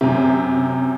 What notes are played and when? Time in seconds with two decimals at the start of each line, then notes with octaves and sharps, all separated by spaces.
0.01 F#2 C3